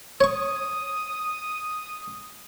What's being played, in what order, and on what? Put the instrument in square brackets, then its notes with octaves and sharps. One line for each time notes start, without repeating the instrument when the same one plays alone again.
[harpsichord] C#5 C#6 [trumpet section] D#6